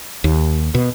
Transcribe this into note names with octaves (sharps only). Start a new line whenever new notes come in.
D#2
B2